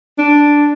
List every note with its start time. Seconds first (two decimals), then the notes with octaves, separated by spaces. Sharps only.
0.18 D4